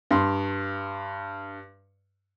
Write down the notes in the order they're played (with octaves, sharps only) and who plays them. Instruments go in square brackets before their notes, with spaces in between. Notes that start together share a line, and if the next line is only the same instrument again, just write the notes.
[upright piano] G2 C6